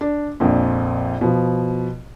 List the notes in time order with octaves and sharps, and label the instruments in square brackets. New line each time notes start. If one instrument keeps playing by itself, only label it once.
[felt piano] D4
A#1 F2 A#2
B2 F3